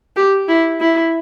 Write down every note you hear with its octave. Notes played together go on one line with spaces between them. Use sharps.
G4
E4
E4